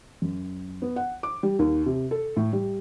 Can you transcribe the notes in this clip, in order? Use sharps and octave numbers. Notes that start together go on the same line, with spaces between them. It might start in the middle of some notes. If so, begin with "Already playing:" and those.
F#2
B3
F#5
D6
G3
D#2
C3
A4
A2
G3